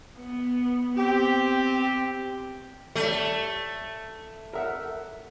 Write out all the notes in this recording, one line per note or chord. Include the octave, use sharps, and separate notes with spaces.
B3
C4 G4
A2 G3 A3
A#4 E5 F#5